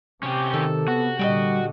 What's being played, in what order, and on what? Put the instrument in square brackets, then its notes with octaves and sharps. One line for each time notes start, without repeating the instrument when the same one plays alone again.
[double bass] C3 [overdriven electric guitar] C#4 G4
[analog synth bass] D#3 [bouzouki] A4
[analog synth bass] B3 [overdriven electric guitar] F#4
[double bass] A#2 D3 [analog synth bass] G3 [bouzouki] G4 G#4 D#5